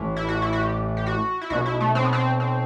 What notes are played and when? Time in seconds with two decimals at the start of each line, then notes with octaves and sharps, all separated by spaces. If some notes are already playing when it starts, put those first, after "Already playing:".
Already playing: A1 A2 E3
0.17 E4
0.29 F#4
0.42 E4
0.53 F#4
0.61 G4
0.97 G4
1.06 F#4
1.41 E4
1.50 B1 B2 F#4
1.66 E4
1.80 A3
1.95 C4
2.05 B3
2.13 C4
2.40 C4